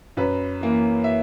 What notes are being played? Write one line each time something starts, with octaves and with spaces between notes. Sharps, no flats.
F#2 B4
E3 A#3
E5